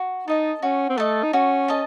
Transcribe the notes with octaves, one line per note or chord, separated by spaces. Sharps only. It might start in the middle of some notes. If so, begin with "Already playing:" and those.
Already playing: F#4
D#4 A4 D#5 A5
C#4 F#4
C4
A3 A4 D#5 A5
D#4
C#4 F#4
A4 D#5 A5